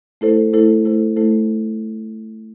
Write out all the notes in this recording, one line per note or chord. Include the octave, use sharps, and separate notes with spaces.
A3 E4 A4 C5
A3 E4 A4 C5
A3 E4 A4 C5
A3 E4 A4 C5